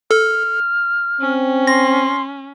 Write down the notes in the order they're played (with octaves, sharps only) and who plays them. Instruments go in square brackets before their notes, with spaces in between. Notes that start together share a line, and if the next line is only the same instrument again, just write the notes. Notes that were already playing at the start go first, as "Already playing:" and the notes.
[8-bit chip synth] A4 [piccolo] F6
[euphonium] C4 [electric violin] C#4
[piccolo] C6 [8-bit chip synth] A#6